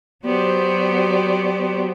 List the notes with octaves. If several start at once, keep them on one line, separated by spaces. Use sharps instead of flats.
F#3 B3 F#4 G4 C5 D5